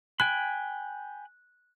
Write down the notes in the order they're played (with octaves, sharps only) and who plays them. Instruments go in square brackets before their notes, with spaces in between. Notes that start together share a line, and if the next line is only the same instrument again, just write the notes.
[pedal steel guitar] G5 G#5 B5 [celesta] F#6